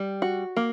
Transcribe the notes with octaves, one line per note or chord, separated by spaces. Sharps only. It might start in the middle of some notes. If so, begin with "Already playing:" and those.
Already playing: G3
F#4
A#3